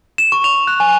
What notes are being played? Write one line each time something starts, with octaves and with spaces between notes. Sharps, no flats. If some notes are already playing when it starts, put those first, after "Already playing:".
E7
C#6
F7
F#6
G#5